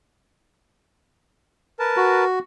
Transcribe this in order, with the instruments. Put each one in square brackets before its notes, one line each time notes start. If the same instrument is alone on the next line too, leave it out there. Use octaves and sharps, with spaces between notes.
[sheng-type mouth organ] A#4 B4 A5
[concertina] F#4